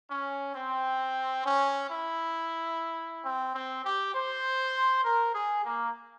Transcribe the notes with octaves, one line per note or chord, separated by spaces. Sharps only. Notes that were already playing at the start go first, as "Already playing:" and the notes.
C#4
C4
C#4
E4
C4
C4
G4
C5
A#4
G#4
A#3